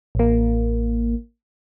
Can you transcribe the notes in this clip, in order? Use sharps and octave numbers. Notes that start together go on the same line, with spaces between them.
A1 A#3